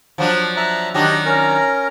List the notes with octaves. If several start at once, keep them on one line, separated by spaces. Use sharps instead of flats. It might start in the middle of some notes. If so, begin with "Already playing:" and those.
F3 F#3 D4
E5 A#5 F#6
D#3 F#3 D4 G4 D#5
C#4 A#4 A#5